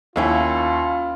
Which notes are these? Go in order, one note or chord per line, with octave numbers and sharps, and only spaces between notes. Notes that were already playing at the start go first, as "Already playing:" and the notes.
D#2 C#4 E4 F4 F5